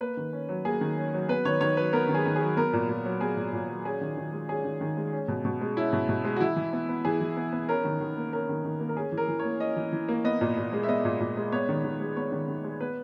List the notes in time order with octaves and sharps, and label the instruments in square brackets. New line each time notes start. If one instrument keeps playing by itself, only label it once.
[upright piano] A#3 B4
D#3
C#4
F#3
A#3 G#4
D#3
C#4
F#3
B3 B4
D#3 C#5
D#3 C#5
F#3 B4
B3 A#4
D#3
G#4
D#3
G#4
F#3
B3 A#4
A#2
A#2
F#3
B3 G#4
A#2
A#2
F#3
C#4 G#4
D#3
D#3
G#3
C#4 G#4
D#3
D#3
G#3
C#4
B2
B2
G#3
C#4 E4
B2
B2
G#3
F#4
E3 E4
E3
B3
B3
E3 G#4
E3
B3
B3
C#4 A#4
D#3
D#3
A#3
C#4 A#4
D#3
D#3
A#3
A#4
C#4 G#4
E3
A#4
E3
A#3 C#5
C#4 D#5
E3
E3
A#3
B3 D#5
A#2
A#2
G#3
E5
B3 D#5
A#2
A#2
G#3
B3 C#5
D#3
D#3
G#3
B3 C#5
D#3
D#3
G#3
B3 B4